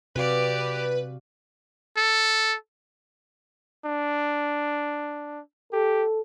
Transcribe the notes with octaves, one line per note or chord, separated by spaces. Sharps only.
C3 F#4 G4 B4 D5 F5
A4
D4
G4 A4